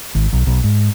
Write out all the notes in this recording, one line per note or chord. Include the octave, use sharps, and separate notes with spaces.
G#1
B1
B1
G#2